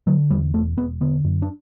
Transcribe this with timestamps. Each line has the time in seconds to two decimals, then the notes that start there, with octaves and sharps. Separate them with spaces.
0.07 D3 F#3
0.30 E2 G3
0.53 E1 A3
0.77 E1 B3
1.01 D3 B3
1.24 F#2
1.42 D4